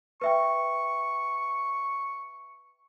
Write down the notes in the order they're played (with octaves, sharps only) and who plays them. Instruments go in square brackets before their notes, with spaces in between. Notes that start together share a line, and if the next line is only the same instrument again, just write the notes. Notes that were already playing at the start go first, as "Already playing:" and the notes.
[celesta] B4 E5 G5 [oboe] C#6